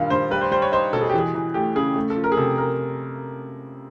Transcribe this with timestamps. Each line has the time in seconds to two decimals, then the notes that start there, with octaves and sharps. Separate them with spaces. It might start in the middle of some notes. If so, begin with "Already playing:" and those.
Already playing: G2 A#2 D#3 G3 F5
0.10 G2 C5
0.31 G3 B4
0.41 C5
0.51 G3 C5
0.62 C#5
0.72 D#4 C5
0.93 B2 A4
1.01 G#4
1.09 G4
1.14 E3 G#4
1.35 E3
1.54 A3 G4
1.75 C#3 G#4
1.96 A3
2.10 A4
2.16 F3
2.24 A#4
2.32 G#4
2.37 C3 A4
2.58 A#4